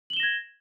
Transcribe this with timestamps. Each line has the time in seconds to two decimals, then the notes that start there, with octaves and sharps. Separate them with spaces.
0.10 F#7
0.13 G7
0.17 E7
0.20 A#6
0.23 G#6